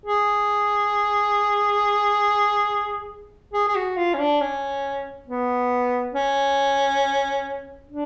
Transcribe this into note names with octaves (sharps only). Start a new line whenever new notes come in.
G#4
G#4
G#4
F#4
F4
C#4
D4
C#4
B3
C#4
D4